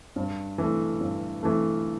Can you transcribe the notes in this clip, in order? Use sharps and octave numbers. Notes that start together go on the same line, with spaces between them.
G2
E3 A3
G2
E3 A3